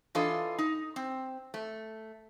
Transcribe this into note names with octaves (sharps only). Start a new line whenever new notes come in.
E3 D4 F4 A4 D#5
D#4
C4
A3